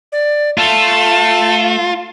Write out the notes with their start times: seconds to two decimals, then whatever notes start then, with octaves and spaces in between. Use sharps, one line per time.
0.12 D5
0.58 A3 F4 A5